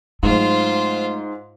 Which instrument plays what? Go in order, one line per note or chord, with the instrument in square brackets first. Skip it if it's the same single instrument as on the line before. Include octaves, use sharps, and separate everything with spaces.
[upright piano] G#2 [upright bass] F#3 A3 [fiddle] F4 C5